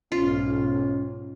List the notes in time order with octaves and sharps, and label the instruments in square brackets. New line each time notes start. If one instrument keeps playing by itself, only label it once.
[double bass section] B1 G#2 [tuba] C#4 [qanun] F4